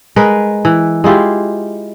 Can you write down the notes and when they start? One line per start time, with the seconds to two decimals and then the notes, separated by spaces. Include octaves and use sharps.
0.16 G#3 A#4 B4
0.65 E3
1.04 G#3 E4 F4 G4